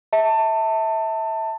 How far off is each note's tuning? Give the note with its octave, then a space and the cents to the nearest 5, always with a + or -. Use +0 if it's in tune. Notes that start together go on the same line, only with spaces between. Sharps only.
E5 -25 A5 +20